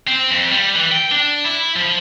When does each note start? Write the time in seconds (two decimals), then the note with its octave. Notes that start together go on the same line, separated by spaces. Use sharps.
0.08 C4
0.31 F2
0.51 G3
0.75 E3
0.92 G5
1.12 D4
1.45 E4
1.76 F3